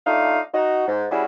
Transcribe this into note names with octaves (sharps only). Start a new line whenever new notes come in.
A3 D4 D#4 F4 F5
D#4 F#4
G#2
G3 C#4 E4 F#4 G#4